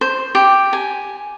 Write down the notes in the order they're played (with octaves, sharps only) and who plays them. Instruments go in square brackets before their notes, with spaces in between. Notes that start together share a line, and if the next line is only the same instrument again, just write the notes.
[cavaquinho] C5
G4
G#5